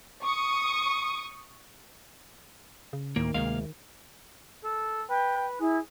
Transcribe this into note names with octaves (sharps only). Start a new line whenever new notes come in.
C#6 D#6
C#3
D2 A2 D#3 A#3
D2 C3 G#3 A#3 F5
A4
B4 G5
B4
E4 G#4